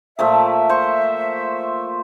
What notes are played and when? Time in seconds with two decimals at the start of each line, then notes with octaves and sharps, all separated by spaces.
0.19 A#2 F3 A3 E5
0.69 C5 C#6